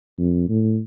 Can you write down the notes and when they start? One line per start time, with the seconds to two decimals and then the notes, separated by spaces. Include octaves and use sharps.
0.19 F2
0.49 A2